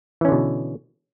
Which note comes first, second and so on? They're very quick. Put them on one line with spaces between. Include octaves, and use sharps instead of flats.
E3 C#4 D3 B2